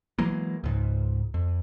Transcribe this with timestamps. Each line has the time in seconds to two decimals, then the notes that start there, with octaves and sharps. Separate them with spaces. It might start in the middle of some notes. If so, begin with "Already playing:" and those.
0.19 E3 F#3 G#3 A#3
0.64 C#2 G#2
1.34 F2